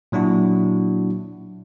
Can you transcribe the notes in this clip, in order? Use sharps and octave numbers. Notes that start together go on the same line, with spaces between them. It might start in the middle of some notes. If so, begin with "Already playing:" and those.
A#2 F#3 D4 E4 F#4